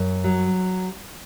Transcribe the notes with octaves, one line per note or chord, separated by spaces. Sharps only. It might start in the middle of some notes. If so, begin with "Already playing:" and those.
Already playing: F#2
F#3